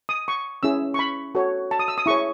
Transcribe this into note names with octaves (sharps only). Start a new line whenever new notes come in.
D#6
C#6
C#4 E4 G#4 E6
C#6
B5
F#4 A4 C#5
A5
D#6
E6
D#6
E4 G#4 C#5 C#6